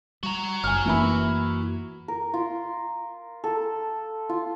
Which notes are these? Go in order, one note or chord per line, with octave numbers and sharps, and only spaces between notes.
G3 F#4 A#5
F#1 G#5 F6
F#2 E3 A#3 E4 B5
A#4
F4
A4
F4